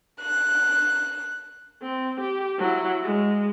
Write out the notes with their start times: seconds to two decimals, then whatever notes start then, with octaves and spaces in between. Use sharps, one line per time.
0.22 F#6
1.82 C4
2.21 G4
2.59 F#3 E4
3.03 G#3